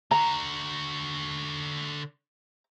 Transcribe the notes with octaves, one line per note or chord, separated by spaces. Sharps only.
D3 F#4 A#5